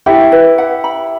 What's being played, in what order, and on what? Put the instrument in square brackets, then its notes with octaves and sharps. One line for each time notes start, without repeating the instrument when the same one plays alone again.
[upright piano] E4 G4 [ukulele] F#5
[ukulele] B4
F#5
B5